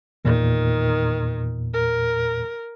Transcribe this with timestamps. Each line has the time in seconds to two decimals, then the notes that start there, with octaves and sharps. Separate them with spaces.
0.25 E2 A#2 D#3
1.73 A#4